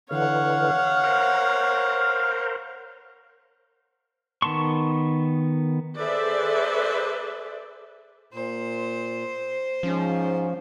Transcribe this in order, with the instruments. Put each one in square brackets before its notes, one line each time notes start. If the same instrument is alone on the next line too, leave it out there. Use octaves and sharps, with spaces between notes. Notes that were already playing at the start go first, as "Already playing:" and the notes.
[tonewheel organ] D3 E3 [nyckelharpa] C#5 F#5 [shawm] F5
[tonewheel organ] A#4 C5
[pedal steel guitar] D#3 B3 A5 C6 C#6
[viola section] G#4 A4 B4 C5 D5 E5
[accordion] A#2 [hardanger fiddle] C5
[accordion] G#2 [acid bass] F3 [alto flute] C#4